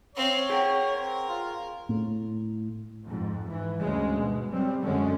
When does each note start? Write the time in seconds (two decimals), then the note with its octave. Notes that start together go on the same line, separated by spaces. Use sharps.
0.15 C4 C#5 F5
0.50 G#4 A#4 F#5 G5
0.97 C4
1.29 F4
1.89 A2
3.04 F2 G#2
3.48 G#2 E3
3.81 D2 G2 C#3 G#3
4.20 B2
4.50 G3 C4
4.83 F#2 D3 G#3 C#4